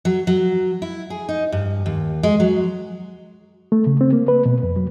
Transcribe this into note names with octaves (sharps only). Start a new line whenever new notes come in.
F#3
F#3
E4
G#4
D#4
G2
D#2
G#3
F#3
A3
C#3
C4
A#3
B4
B2
F2
F#3